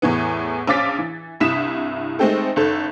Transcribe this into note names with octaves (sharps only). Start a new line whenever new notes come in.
E2 A2 E3 B3
A#1 C#4 F5 D6 A6 B6
E3
C2 G2 E4 D#6 B6 E7
D#3 G#3 A3 C4 G4 A4
F#1 D#3 A4